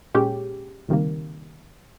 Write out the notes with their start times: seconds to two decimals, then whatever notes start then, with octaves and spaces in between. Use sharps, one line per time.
0.15 A#2 G#3 C#4 G4
0.88 C#2 C3 D#3 G3 A#3